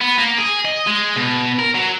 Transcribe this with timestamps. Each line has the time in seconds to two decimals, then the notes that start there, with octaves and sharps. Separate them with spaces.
0.01 B3
0.19 A#3
0.38 G#4
0.65 D#5
0.87 G#3
1.16 B2
1.59 A#4
1.75 F#3